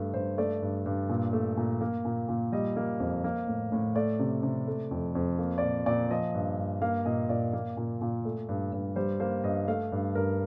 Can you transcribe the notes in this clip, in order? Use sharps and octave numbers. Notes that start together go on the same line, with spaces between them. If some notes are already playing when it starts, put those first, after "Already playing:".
Already playing: G2 A3
G2 C5
A3 D5
G2
G2
A#2
A3
A#2
A#3
A#2
A#2
G3 D#5
A#3
F2
A#3
A2
A2
A3 D5
C3
C3
A3
F2
F2
A#3
D5
A#2 C5
A#2 D5
F3 D#5
G2
G2
A#3 F5
A#2 D#5
A#2 D5
A#3
A#2
A#2
A3
G2
G2
G3 C5
A#3 C5
G2 D#5
A3 F5
G2
G2 A#4